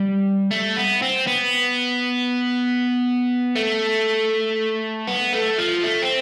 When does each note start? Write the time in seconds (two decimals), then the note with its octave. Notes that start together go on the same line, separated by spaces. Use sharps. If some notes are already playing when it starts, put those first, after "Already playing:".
Already playing: G3
0.51 A3
0.76 B3
1.02 C4
1.27 B3
3.56 A3
5.07 B3
5.33 A3
5.58 F3
5.83 A3
6.02 C4